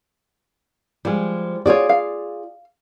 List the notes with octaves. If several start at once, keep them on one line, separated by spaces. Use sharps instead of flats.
F3 G3 G#3
F4 F#4 G#4 C#5 D5
F5